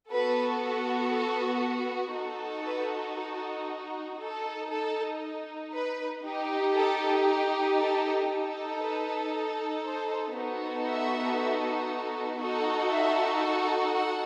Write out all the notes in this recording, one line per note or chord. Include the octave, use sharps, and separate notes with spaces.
B3 F#4 A4 B4
A4
D#4 F#4 A4
B4
A4
D#4 A4
A4
B4
D#4 G4
A4
A4
D#4 A4
B4
C5
B3 D#4 F#4 A4
E5
D#4 F#4 A4
E5
F#5